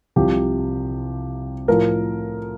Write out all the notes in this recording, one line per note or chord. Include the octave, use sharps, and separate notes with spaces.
C2 C3 F3 G4
A2 F3 A#4